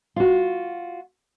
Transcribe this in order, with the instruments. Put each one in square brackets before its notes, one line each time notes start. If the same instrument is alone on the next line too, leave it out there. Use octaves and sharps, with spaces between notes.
[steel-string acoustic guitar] F4 F#4